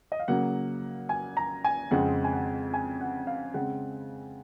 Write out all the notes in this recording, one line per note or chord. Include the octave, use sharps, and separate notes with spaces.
D#5
F5
C#3 F#3 A#3 F#5
G#5
A#5
G#5
F2 C#3 G#3 C4 F#5
G#5
F#5
G#5
F#5
F5
C#3 G#3 C4 F#5